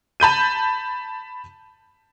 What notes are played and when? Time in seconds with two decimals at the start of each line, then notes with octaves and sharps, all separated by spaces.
0.20 A5 B5 G6 D#7